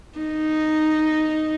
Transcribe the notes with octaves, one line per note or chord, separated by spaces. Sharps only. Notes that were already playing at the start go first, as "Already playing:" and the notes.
D#4